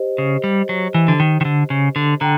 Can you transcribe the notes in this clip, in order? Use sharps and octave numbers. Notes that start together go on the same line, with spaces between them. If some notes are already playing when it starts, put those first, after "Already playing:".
Already playing: G4 C5 D#5
C#3
G3
F#3
E3
D3
D#3
D#3
D3
C#3
D3
D3 G5 A#5